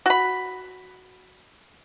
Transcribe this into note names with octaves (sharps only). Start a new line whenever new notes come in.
F#4 B5